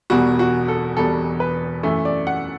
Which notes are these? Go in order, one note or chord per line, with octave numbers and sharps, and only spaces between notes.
E1 E2 B2 G3 F#4
F#4
A4
E1 E2 B2 G3 A4
B4
F#2 E3 A3
D5
F#5